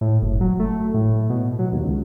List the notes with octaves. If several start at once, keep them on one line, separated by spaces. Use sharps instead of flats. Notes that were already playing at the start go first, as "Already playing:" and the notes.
A2
F#1
F#3
A3
A2
B2
F#3
D#2
C#2